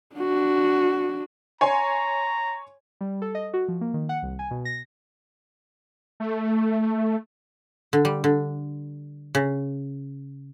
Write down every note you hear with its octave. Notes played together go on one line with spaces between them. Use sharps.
D4 F#4
C#5 G#5 A#5 C6
G3
A4
D#5
F#4
F3
A#3
D#3
F#5
C2
G#5
B2
A#6
A3
D3
G3
D3
C#3